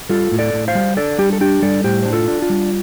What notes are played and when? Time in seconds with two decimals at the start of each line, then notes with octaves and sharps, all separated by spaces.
0.09 G3 F4 A4
0.32 A2
0.39 A4 D5
0.53 A2
0.68 C5 F5
0.75 G3
0.97 D4 A4 D5
1.18 G3 G4
1.33 A4
1.41 D4 G4
1.62 G3 A4 D5
1.84 A2 G4 C5
2.03 D4 C5
2.13 F4 A4
2.28 D4
2.42 F4
2.50 G3